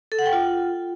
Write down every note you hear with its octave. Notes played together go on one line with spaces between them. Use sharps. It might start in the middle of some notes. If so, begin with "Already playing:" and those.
A4
F#5
G5
F4